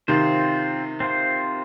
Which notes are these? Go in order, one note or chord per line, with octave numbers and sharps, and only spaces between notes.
C3 D#3 C4 F4 C5
C4 F4 C5